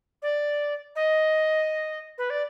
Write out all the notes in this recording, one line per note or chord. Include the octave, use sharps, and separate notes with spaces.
D5
D#5
B4
D5